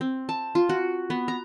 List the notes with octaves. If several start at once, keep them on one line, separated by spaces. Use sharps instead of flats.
C4
A5
F4
F#4
B3
A#5